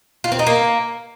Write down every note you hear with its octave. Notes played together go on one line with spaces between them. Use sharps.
F4
C4
D#4
A#3